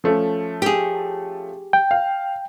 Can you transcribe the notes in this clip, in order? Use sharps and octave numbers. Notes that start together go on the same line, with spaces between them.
F3 A3 C#4
G4 G#4
G5
F5